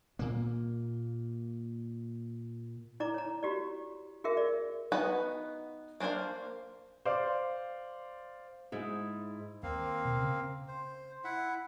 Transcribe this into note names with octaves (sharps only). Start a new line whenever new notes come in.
A#2 A#3
E4 D5 A#5 D6
C#5 A#5
F#4 G4 D5
F#4 G#4 A#4 E5
D5
B3 D#4 F#4 B4 F#5
A#3 B3 D4 C5 F5
C5 D5 F5 D6
G#2 E4
D#2 A#3 C4 F5
B2
C#3
C5
E4 E5 F#5